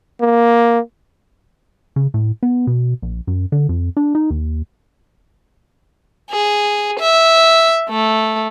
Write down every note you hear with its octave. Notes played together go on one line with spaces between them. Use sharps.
A#3
C#3
A2
B3
B2
A#1
F#2
D3
F2
D4
D#4
D#2
G#4
E5
A3